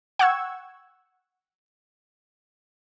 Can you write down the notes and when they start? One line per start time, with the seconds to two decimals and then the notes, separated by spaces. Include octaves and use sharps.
0.19 F#5 G5 C#6 E6 G#6